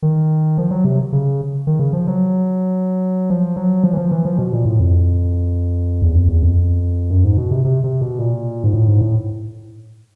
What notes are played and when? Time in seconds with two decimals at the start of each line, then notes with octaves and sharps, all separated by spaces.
0.02 D#3
0.58 F3
0.71 F#3
0.85 C3
1.13 C#3
1.67 D#3
1.79 C#3
1.93 F3
2.07 F#3
3.30 F3
3.56 F#3
3.84 F3
3.93 E3
3.97 F3
4.11 E3
4.25 F3
4.38 B2
4.53 A#2
4.65 A2
4.80 F2
6.02 E2
6.15 F2
6.29 E2
6.43 F2
7.10 F#2
7.24 G#2
7.37 B2
7.51 C3
7.65 C3
7.84 C3
8.01 B2
8.19 A#2
8.64 G#2
8.74 A2
8.88 G#2
9.01 A2